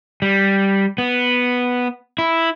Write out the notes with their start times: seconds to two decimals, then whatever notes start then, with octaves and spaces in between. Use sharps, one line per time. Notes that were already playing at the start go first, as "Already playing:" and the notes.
0.22 G3
0.98 B3
2.19 E4